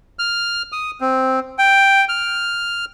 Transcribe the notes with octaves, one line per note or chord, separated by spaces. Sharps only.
F6
D#6
C4
G5
F6